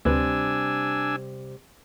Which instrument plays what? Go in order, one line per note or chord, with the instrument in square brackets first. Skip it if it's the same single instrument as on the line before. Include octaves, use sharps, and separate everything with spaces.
[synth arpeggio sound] D2 B4 [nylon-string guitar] C3 G3 [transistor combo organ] D4 G#5 E6